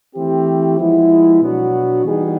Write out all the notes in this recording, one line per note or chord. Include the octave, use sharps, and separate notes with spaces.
E3 A3 C4 E4 G4
F3 G#3 B3 E4
B2 F#3 B3 D4 F#4
E3 G3 B3 D#4 G#4